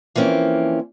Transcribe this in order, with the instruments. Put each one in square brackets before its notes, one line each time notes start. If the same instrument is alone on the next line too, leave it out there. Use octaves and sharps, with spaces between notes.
[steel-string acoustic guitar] E3 F3 A#3 C4 C#4